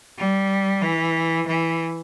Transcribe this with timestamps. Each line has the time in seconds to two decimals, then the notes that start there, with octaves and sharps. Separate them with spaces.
0.18 G3
0.82 E3
1.47 E3